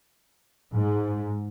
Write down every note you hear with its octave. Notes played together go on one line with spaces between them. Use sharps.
G#2